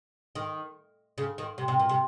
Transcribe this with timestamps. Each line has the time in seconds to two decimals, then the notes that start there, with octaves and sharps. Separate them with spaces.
0.35 D#3
1.18 C#3
1.38 D#3
1.58 C3
1.68 C3
1.80 A#2
1.89 C3